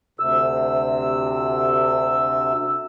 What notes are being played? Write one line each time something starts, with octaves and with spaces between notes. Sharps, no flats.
D2 C3 E6